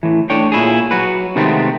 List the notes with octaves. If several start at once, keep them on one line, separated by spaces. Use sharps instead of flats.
A2 E3
A3 D4 C#5 G5
A#2 E4 G#4
F#3 F#4 B4
C3 D#3 G#3 A3 B3 C4